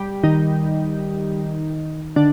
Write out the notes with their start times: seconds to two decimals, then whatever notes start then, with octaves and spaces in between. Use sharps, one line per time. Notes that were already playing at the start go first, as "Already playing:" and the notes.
Already playing: G3 G4
0.24 D#3 D#4
2.16 D3 D4